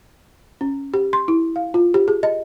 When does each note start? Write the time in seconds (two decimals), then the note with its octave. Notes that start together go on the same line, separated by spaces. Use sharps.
0.61 C#4
0.94 G4
1.13 C6
1.28 E4
1.56 F5
1.74 F4
1.94 G4
2.08 G#4
2.23 D#5